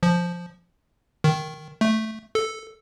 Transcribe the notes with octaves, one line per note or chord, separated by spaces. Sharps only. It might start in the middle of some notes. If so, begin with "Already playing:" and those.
F3
D#3
A3
A4